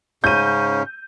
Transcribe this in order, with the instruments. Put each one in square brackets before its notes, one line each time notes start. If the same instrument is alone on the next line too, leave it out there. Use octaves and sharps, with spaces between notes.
[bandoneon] G#2 C#3 C#4 [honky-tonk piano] G6 D#7